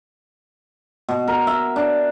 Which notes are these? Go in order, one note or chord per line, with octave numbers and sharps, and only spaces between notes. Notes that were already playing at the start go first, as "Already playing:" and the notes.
B2
A#4
E5
D4